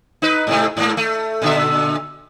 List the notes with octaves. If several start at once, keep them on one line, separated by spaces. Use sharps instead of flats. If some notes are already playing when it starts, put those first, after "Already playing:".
D#4 B4
G#2 C3 A3
G#2 A#3
A3
A#2 D3 E5